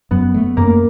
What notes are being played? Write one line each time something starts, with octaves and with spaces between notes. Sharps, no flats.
F#2 B3
A3
F#2 A#3